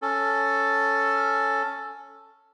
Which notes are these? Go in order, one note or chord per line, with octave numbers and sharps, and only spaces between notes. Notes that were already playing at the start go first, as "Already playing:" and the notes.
C#4 A4